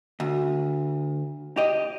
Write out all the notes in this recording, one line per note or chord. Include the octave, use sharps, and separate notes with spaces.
D2
G4 D#5